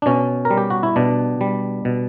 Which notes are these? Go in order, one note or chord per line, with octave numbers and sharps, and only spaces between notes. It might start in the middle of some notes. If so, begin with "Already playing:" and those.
D4
B2 C#4
A#4
G3
G4
F#4
E4
B2 D4
G3
B2